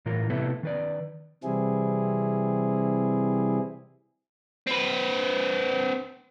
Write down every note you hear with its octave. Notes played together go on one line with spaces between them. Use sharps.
A2 E3 F4 A#4
C3 A3 B3 E4 A4 B4
D#3 B4 D5
C3 E3 G3 C4 E4 G#4
C4 B4